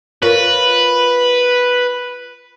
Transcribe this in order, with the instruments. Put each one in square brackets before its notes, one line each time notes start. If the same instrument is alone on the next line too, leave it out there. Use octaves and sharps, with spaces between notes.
[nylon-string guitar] F4 A#4 C#5 [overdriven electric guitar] B4